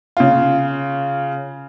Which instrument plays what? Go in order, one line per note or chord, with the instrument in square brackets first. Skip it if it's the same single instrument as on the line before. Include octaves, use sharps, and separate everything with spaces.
[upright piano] C#3 F4